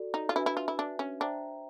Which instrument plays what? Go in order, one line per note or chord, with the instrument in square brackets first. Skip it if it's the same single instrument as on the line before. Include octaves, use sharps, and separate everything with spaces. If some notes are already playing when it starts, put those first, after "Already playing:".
Already playing: [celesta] F#4 A4 D5
[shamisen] D#4
F4
[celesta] D4 F#4 B4 E5 G#5 [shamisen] E4
[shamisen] E4
F4
E4
D4
C#4
[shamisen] D4 [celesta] C5 E5 G5 A#5